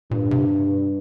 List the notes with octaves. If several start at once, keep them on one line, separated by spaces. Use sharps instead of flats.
G2 A#2
C3